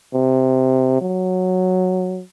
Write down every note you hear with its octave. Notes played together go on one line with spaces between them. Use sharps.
C3
F#3